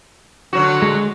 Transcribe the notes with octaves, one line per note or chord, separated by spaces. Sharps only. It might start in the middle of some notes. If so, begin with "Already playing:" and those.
D3 F#3 F#4
G#3